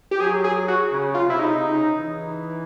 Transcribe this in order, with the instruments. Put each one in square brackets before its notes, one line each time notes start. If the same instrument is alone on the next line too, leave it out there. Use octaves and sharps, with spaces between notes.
[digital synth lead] G4
[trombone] F#3 [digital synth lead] G#4
[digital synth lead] G#4
F#4
[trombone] C#3
[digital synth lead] F4
[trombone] C3 [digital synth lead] E4
[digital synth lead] D#4
[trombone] C#3
E3